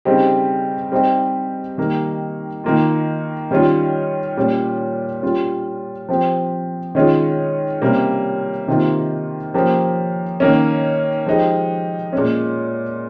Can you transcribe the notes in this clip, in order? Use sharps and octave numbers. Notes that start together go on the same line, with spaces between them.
C#3 G3 C4 D#4 G4
G3 C4 D#4 G4
D#3 G3 A#3
D#3 A#3 F4
D#3 G3 C#4 F4
A#2 G3 C#4
G3 C#4 F4
F3 C4 G4
D#3 G#3 C#4 F4
C3 G3 A#3 C#4
C3 D#3 A#3 F4
F3 A#3 C#4 G4
D#3 A#3 C#4
F3 G#3 D#4 G4
A#2 G#3 C#4